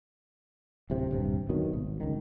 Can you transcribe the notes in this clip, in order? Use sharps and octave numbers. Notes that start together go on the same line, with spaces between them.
D1 A2 C3
D#1 G2 C3
B2 D#3 F#3
G#1
C#2 D#3